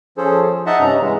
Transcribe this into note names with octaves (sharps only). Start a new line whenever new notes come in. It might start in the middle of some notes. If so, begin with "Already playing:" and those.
F3 C#4 G#4 A4 C5
F3
D#4 D#5 E5 F#5 A5
G2 C3 C#4 A#5
E3 G#3